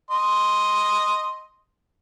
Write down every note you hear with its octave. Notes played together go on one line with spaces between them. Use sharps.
D#5 C6